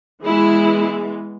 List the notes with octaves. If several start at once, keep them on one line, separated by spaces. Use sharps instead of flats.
E3 G#3 B3 E4 G#4